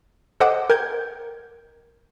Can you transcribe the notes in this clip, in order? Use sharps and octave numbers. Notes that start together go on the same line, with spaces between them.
A4 C5 D#5 F#5 D6
A#4 G5 G6 G#6